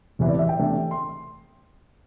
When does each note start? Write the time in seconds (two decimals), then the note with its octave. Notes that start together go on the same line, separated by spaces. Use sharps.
0.19 E1 E2 C3 E3
0.29 D5
0.39 E5
0.49 G5
0.59 E2 C3 A3 D4
0.91 C6